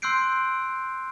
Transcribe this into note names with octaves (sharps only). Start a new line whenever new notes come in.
C6 E6 F#6 G6 C7 D7